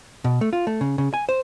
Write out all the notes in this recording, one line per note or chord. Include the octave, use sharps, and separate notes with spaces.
B2
A3
F4
A3
C#3
C#3
G#5
C5